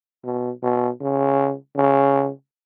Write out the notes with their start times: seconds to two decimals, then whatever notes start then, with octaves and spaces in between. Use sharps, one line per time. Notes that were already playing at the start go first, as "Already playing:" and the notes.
0.24 B2
0.63 B2
1.01 C#3
1.76 C#3